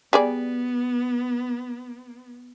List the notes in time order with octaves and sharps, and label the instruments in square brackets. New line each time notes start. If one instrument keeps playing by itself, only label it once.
[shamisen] G3 G#4 D5 [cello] B3